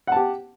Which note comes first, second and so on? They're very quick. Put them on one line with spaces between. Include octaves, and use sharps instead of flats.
F#5 A5 G4